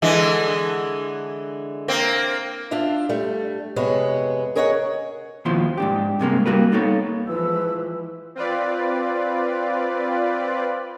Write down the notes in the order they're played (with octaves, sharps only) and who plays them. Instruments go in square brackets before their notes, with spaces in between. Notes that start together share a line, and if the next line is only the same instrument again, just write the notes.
[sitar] D3 E3 G#3
A#3 C4
[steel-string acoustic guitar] D4 F4 E5 F5
G3 A3
F2 C3 G#3 B3 C#5
G#4 A#4 C#5 D#5 E5 F#5
[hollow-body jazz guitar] D#2 B2 F3 E4 C6
G#2 D4 G4
G2 C3 G#3 A#3
G3 A#3 F#4 A#4 B4
A#3 B3 D#4 A4 C#5
[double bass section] E3 F3 G#3 [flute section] B4 E6
[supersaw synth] C4 F4 B4 D5